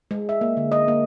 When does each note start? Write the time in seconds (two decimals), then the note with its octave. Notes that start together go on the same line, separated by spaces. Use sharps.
0.11 G#3
0.29 E5
0.41 A#3
0.57 D3
0.72 D#5
0.88 A#3